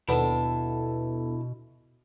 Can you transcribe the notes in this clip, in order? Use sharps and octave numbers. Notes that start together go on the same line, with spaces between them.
D#2 B2 B3 D4 E4 A4 A5